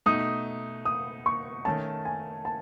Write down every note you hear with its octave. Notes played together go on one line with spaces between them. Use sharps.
B2 A3 D#4 D#6
D#6
C#6
D#3 A3 C#4 A5
G#5
A5